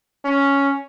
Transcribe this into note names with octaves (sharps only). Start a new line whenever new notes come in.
C#4